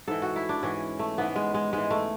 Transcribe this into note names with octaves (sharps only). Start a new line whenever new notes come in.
G#2 E3 A4
F#4
E4
D4
G#2 E3 C#4
A3
G#2 E3 B3
G#3
G#3
G#2 E3 G#3
A3